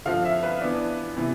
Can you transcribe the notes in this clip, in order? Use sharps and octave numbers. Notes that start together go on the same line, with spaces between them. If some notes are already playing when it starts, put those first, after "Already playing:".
D3 F3 C4 F5
E5
B4
E3 B3 D4
C3 E3 B3